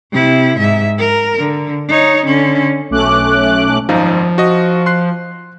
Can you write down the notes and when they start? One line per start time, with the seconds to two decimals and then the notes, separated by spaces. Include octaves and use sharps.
0.12 C3 E4
0.58 G#2 E5
0.98 A#4
1.39 D3
1.89 D#4 C#5
2.25 D3 C#4
2.90 B1 A3 C#4 D6 F#6
3.89 G#1 F#2 F3 D#4
4.38 F#4 D#5
4.86 C6 F#6 C7